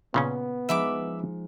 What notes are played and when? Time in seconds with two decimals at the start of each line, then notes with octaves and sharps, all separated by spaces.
0.14 A#2 C#3 B3 C#4
0.69 F3 G#3 D#4 E5 B5 D6